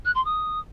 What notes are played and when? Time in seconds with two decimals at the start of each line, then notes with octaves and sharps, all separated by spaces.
0.05 F#6
0.15 C6
0.25 D#6